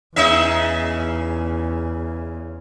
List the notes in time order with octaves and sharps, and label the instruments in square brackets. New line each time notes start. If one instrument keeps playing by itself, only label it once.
[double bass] E2 [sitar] C#3 D#4 E5